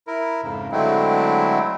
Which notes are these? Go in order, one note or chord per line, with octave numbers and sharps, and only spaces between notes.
E4 A#4
F2 G#2 C#3
D3 F#3 G#3 A3 C4 E4